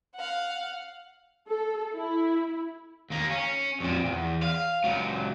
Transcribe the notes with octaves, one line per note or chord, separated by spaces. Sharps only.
F5 F#5
A4
E4
D#2 A#3
C#4
F2 A#2
E2
F5
C#2 F#3